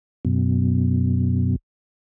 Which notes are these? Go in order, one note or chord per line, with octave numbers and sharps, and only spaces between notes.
F#2 B2